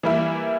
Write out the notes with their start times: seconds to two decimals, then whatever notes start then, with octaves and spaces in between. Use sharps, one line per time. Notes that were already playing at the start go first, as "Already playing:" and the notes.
0.03 E3 G3 A#3 E4